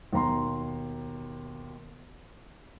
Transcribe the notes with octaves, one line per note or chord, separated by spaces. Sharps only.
D#2 B2 A#5 C6